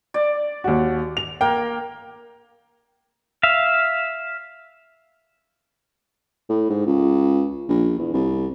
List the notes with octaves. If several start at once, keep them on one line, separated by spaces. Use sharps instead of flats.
D5
D#2 F#4
F7
A#3 G5
E5 F5
A2
G#2
C#2
A#1
E2
C2